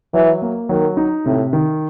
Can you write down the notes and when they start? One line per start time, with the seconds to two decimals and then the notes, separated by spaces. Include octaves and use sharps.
0.14 E3 F#3
0.42 A#3
0.69 D#3 F#3
0.97 D#4
1.26 A2 C3
1.53 D#3